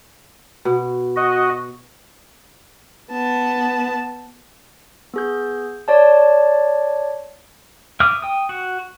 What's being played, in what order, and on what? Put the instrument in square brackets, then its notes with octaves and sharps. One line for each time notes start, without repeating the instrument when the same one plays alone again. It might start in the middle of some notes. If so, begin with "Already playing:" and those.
[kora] B2
[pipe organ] F#4 D#5
[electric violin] B3 A5
[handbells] B3 G#4 G6
C#5 D5 A5
[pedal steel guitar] E5 D6 D#6 F6
G5 D#6
F#4